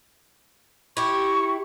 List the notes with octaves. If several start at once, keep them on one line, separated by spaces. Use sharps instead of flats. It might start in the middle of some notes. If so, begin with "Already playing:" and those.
E4 G4 C#6